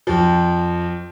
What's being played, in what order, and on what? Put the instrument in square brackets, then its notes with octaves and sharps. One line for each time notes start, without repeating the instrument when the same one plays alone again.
[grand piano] F2 F3